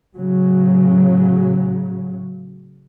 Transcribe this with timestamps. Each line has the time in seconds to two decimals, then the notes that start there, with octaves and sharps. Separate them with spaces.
0.16 A2 C#3 F#3